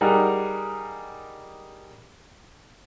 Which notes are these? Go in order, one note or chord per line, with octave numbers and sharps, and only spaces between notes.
G3 D#4 G#4 A#4 F#5